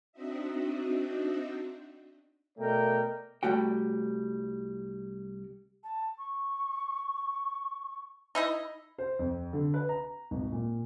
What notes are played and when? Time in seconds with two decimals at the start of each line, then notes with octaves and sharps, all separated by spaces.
0.12 C4 D4 D#4 F#4 D#5 E5
2.57 B2 A3 A#4 D5 D#5 G5
3.43 C2 C#3 G3 A3 F#4 G5
5.84 A5
6.18 C#6
8.35 D#4 E4 D#5
8.98 C5
9.19 F2
9.53 D3
9.74 B4
9.89 A#5
10.31 G#1
10.52 A#2